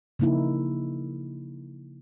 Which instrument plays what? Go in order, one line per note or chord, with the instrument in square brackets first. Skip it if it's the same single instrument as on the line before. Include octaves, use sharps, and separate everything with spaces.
[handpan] C#3 F3 A#3 D#4 E4